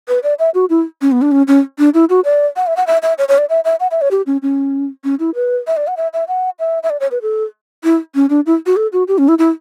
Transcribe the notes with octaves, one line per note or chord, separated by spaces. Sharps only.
B4
D5
E5
F#4
E4
C#4
B3
D4
C#4
C#4
D4
E4
F#4
D5
F#5
E5
F#5
E5
E5
C#5
C#5
D5
E5
E5
F#5
E5
C#5
G4
C#4
C#4
C#4
E4
B4
E5
D5
F#5
E5
E5
F#5
E5
E5
D5
C#5
B4
A4
E4
C#4
D4
E4
F#4
A4
F#4
G4
C#4
E4
E4